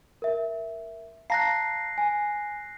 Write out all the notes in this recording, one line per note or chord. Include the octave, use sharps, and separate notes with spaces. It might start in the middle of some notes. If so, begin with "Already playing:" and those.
A#4 E5
F5 A5 A#5 F#6 A#6 C7
G#5